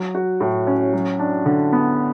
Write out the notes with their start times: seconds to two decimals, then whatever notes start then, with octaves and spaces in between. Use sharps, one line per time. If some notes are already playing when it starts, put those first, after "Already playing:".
Already playing: F#3
0.15 F#4
0.40 A2
0.67 C#4
0.93 F#3
1.19 D4
1.46 D3
1.72 B3